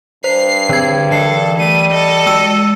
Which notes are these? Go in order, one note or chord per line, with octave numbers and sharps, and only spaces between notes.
G2 C5 C7
D3 G#6
E3 A4 C7
G3 A3 D#7
A4 D#5
G#3 E6